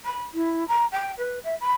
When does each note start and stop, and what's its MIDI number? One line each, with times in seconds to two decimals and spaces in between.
0.05 0.23 83
0.33 0.64 64
0.68 0.85 82
0.91 1.11 79
1.18 1.39 71
1.43 1.54 76
1.60 1.74 83